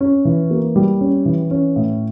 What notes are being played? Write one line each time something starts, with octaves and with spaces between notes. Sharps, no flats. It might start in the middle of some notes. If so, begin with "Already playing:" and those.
C#4
E3
A#3
G3
C#4
E3
C#4
A2